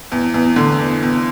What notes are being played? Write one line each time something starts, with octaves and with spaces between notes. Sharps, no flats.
E2
E2
D3
E2
E2